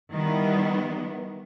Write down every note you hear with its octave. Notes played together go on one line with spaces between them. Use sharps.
D#3 E3 G3 B3